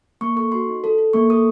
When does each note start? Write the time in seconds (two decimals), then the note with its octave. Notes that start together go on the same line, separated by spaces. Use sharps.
0.21 A#3 C#6
0.36 A4 C#6
0.52 F#4 C6
0.68 D#4
0.84 A4
0.98 A4
1.13 A#3 C#6
1.30 A4 D#6